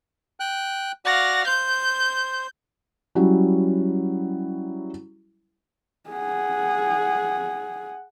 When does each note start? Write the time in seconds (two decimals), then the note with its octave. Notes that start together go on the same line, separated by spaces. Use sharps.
0.40 G5 F#6
1.06 F#4 D5 F5 F#5 A#6
1.47 C5 G6
3.15 F#3 G3 C#4 E4
6.10 G#4 F#5